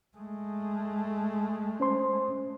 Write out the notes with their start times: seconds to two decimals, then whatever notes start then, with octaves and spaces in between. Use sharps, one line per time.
0.18 G#3 A3
1.80 C#4 C5 C6